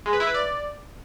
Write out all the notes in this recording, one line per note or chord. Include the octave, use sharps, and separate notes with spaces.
G#3
B4
E4
B4
D5